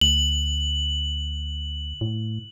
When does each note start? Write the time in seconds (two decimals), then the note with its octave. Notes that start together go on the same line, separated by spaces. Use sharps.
0.01 D2 F#7
2.01 A2